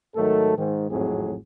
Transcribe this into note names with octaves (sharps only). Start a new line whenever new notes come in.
G#2 D#3 F#3 A3 A4
G#2 D#3
G#1 F2 A2 F#3 C4 G#4